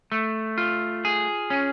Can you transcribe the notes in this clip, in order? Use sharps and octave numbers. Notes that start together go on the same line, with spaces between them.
A3
F4
G#4
C#4